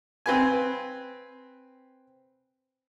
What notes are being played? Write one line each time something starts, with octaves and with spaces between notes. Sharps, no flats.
C4 B4 G#5